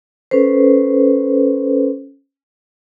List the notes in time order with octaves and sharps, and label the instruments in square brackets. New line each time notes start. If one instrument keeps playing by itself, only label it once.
[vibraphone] C#4 A4 B4 C5